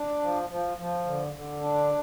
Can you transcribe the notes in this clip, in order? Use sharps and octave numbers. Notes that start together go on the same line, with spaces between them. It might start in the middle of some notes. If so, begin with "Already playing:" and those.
Already playing: D4
F3
F3
F3
D3
D3
D4